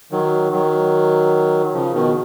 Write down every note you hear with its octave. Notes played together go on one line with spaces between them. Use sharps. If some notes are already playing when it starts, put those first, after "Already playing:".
D#3 F#3
D#3 F#3
C#3 F3
B2 D#3